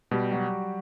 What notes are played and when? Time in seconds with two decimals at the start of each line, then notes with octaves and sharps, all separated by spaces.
0.11 B2 G3 G4
0.31 F#3 F#4